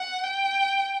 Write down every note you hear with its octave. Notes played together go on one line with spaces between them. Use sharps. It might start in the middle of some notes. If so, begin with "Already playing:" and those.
Already playing: F#5
G5